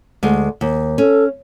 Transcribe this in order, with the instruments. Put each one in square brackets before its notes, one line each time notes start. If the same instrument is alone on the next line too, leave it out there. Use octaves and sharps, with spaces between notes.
[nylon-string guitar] D2 G#3
D#2
[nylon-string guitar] C#4 [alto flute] A4